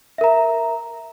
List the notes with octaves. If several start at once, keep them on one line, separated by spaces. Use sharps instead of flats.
A#4 E5 A#5